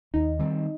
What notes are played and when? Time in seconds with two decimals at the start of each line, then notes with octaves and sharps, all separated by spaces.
0.14 D#2 D#4
0.39 D#3 G3 C4